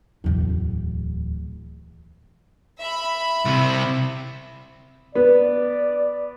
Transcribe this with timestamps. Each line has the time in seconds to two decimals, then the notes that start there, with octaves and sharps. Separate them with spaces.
0.24 D1 E2
2.79 E5 B5
3.45 C2 C3
5.15 B3 D5